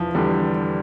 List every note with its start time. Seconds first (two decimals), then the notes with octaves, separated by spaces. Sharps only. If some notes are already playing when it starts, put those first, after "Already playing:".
Already playing: E1 E3 F3
0.15 E2 D3 G3